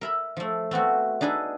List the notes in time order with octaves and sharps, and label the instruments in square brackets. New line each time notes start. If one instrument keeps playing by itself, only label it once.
[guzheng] A#4 E5 B5
F3 A3
A3 B3 C4 F#4
D4 D#4 G#4 B4 E5